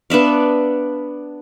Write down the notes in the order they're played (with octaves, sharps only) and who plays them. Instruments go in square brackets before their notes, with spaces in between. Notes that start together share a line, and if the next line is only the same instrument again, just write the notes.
[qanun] B3 D4 E5 F5